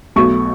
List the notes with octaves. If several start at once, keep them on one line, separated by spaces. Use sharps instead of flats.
B1 B2 A3 C#6